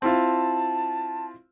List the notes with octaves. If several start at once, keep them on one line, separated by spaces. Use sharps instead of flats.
C4 E4 F4 A5